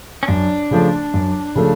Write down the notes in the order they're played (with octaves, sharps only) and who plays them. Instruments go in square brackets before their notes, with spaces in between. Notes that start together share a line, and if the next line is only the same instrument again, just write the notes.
[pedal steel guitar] C#4
[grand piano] F#2 [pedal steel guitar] D4
[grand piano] C#3 F3 A3
F#2
C#3 F3 A3